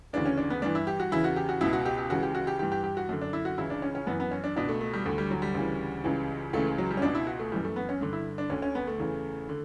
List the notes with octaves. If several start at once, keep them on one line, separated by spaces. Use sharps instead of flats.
D2 C#3 E3 D4
C#4
D4
B3
G2 E3 D4
E4
G4
F#4
E2 C#3 E3 E4
F#4
G4
F#4
C#2 B2 E4
F#4
G4
G4
C#2 C#3 E3 F#4
G4
F#4
G4
G2 E3 G4
G4
G4
F#4
F#2 D3
D4
E4
F#4
C#2 C#3 E3 E4
D4
C#4
C#4
F#2 E3 B3
B3
C#4
D4
C#2 B2 D4
A3
A3
G3
D2 D3 A3
G3
F#3
G3
D2 C#3 E3
C#2 C#3 E3
C#2 C#3 E3 A3
F#3
G3
C#4
C#2 B2 D4
E4
F#4
A3
F#2 E3 G3
A3
B3
C#4
G2 D3
E4
D4
D2 D3 C#4
C#4
B3
A3
E2 C#3 E3
D3